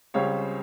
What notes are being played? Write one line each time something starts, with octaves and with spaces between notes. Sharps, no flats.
C#2 C#3 G3 C4 C#5 F5